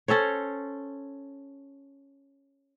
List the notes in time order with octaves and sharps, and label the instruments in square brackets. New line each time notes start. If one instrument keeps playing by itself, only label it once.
[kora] C#4 A4 C5 C#5